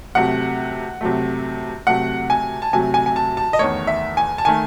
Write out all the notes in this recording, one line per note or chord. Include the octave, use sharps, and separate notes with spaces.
C3 F#3 A3 F#5
C3 F#3 A3
C3 F#3 A3 F#5
G#5
A5
C3 F#3 A3 G#5
G#5
G#5
A5
A5
D#5
E2 D#3 A3 C#5
E5
G#5
A5
D#3 A3 G#5